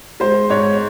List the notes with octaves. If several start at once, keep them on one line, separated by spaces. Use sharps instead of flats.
G#3 C5
G#2 C#5